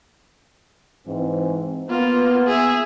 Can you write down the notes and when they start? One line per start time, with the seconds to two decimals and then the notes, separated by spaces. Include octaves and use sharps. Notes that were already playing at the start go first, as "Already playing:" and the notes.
1.06 G#2 E3 C4
1.89 A#3 B3 F4
2.47 G#4 E5